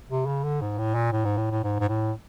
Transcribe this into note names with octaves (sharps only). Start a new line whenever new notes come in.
C3
C#3
D3
G#2
A2
A#2
A2
G#2
A2
A2
G#2
G#2
A2